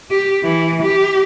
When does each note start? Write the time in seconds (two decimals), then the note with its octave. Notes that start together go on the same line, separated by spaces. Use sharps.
0.11 G4
0.44 E3
0.82 G4